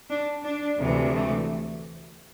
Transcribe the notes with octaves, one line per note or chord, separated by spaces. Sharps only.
D4
D4
D2 C3 E3
A3